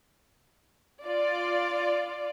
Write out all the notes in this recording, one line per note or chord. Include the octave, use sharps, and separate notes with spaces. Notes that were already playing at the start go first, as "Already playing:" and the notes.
F4 D5